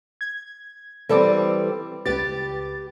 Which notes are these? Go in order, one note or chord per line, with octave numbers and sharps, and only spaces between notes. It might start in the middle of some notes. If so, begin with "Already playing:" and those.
G#6
E3 G3 C4 A4 D6
C#2 G4 B4 A6